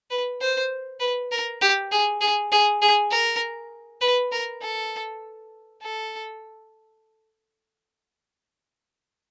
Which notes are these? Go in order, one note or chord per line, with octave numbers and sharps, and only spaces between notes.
B4
C5
B4
A#4
G4
G#4
G#4
G#4
G#4
A#4
B4
A#4
A4
A4